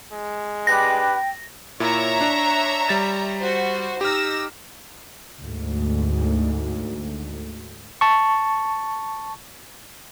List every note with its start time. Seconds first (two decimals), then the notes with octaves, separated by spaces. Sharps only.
0.13 G#3
0.67 D4 G4 B4 G5 A#6
1.80 A#2 E4 C#5 E5 A#5
2.21 D4
2.88 G3 A6 E7
3.40 F#4 C5
4.01 D#4 G4 E6 F6 A#6
5.41 D2 G#2
8.01 A5 C#6